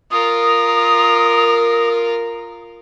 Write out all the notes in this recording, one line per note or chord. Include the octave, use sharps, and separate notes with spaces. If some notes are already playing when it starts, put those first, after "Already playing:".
F4 A#4 D#6